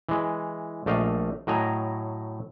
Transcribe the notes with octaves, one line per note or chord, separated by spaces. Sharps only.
E3 G#3
A#1 A3 D5 D#5 F5
A2 F#3 D#5 G#5 A#5